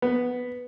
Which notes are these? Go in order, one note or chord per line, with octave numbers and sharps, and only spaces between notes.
B3